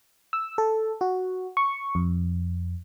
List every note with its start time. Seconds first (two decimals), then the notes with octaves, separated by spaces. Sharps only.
0.33 E6
0.58 A4
1.01 F#4
1.57 C#6
1.95 F2